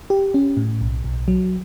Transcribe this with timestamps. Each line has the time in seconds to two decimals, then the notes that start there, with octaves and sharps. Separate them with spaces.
0.10 G4
0.34 C#4
0.57 A2
0.81 B1
1.04 B1
1.28 F#3